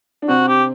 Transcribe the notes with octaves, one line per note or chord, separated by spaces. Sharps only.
D4
C3 C4 F#4
G4